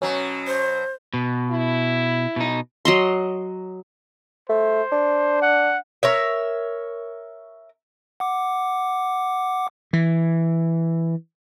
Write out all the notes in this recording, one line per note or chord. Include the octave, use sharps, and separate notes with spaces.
B2 F#3 C#4
C5
B2
E4
B2 D#4
F#3 D#5 C6
A3 C5
D4
F#5
A#4 C#5 E5
F#5 D6
E3